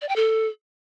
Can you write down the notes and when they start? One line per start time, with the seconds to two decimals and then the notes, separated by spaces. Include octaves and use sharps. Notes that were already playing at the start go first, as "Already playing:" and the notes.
0.02 D5
0.09 G5
0.16 A4